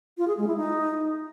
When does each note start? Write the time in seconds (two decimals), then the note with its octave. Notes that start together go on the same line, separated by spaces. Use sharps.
0.18 F4
0.28 G#4
0.37 G#3
0.47 E4
0.57 D#4